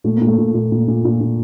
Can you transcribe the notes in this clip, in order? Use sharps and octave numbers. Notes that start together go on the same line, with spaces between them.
A#2 A3
A#3
A#2
A3
A#2
A#2
A#2
A#2
A#2
A#2